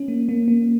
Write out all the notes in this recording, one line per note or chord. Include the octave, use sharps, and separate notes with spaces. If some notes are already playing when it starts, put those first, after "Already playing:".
Already playing: C#4
A#3
A#3
A#3